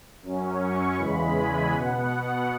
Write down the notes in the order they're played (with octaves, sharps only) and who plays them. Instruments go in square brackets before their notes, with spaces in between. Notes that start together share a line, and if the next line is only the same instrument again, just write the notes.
[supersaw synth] F#2 F#3 C#4
C#6
E2 C#3 E3 G#3 B5
G#5
B2 B3 F#5